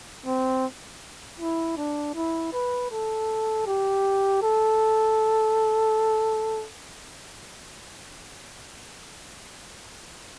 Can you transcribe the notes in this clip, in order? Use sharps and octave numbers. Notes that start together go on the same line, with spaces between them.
C4
E4
D4
E4
B4
A4
G4
A4